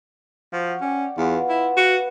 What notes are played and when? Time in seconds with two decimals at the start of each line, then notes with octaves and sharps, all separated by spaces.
0.53 F3 F#4
0.81 C#4 D5 G5 C#6
1.18 E2 B3 F4
1.49 E4
1.77 F#4 B4 F#5